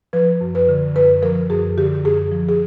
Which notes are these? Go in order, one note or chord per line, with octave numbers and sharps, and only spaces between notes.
F3 B4
F#2
B4
D3
F#2 B4
F3 A#4
F#2 G#4
D3 G4
F#2 G#4
F3
G#4